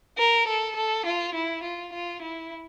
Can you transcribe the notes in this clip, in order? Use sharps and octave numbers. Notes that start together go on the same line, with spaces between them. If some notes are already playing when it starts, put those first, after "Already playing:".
A#4
A4
A4
F4
E4
F4
F4
E4